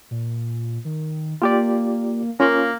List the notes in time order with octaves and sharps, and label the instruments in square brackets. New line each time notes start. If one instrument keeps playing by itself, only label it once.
[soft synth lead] A#2
D#3
[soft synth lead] A#3 [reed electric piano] F4 G4 D5
[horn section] A#3 [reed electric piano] C#4 F4